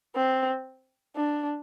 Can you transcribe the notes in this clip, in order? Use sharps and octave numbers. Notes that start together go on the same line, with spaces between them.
C4
D4